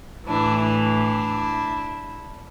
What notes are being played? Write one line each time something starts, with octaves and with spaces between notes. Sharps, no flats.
A2 E3 D4 E4
D4 E4